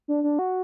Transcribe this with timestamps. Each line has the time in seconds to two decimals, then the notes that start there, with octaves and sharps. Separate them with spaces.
0.08 D4
0.24 D4
0.39 F#4